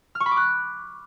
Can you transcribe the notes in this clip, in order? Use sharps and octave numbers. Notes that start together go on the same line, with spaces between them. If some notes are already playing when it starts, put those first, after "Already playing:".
F6
C#6
B5
D6
F#6